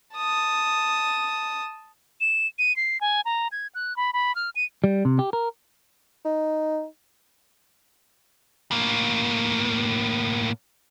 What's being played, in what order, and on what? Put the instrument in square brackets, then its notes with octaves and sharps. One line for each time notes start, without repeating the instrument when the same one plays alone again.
[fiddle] A5 D#6
[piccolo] E7
D#7
C7
G#5
A#5
G#6
F#6
B5
B5
F6
D#7
[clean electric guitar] G3
C3
G4
A#4
[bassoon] D#4
[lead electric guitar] A2 A#3